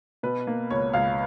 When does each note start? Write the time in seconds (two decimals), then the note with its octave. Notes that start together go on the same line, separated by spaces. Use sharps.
0.23 B2 B4
0.47 A#3
0.70 C#2 C#5
0.93 C#2 F5